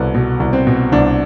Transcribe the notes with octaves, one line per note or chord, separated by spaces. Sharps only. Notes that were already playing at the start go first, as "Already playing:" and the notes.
Already playing: C2 B2 A4 B4
B2
C2
C4
B2
C2 D4